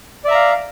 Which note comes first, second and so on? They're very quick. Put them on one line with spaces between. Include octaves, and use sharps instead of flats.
D5 E5 A#5 F5